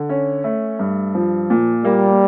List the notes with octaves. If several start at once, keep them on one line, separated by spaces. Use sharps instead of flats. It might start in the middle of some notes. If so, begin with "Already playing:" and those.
Already playing: D3
C#4
A3
G2
F3
A#2
G3 A#3